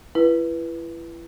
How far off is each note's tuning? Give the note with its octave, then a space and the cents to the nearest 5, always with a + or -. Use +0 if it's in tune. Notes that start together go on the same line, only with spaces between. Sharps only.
E4 +35 B4 -15